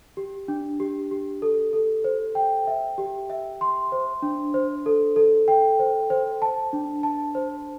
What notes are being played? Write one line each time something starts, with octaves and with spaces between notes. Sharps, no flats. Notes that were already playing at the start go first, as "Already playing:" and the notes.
G4
D4
G4
G4
A4
A4
C5
G5
E5
G4
E5
C6
C5
D4
C5
A4
A4
G5
C5
C5
A5
D4
A5
C5